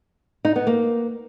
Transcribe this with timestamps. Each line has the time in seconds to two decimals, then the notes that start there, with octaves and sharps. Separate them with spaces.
0.45 D#4
0.56 B3
0.67 A#3